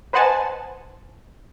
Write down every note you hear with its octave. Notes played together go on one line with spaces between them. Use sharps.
B4 C5 D#5 F#5 G#5 A5